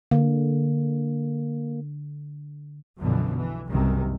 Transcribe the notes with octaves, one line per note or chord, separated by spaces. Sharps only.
D3 A#3
B1 F#2 B2 D3 E3 F3
E3
F#1 C2 G2 C3 D#3 E3